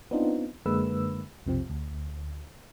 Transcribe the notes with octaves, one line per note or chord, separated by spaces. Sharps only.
B3 C4 D4 D#4 F4
F#2 D3 G#3 A#3 B4 E6
B1 F2 C3 F3 C4
D2